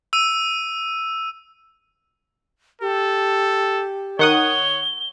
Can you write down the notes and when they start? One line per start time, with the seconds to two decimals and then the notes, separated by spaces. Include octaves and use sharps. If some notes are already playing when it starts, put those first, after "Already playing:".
0.13 E6 D#7
2.81 G4 A4
4.19 D#3 C#5 F#5 D#6 G7